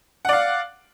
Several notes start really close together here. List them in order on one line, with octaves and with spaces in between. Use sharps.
F#5 D5 F5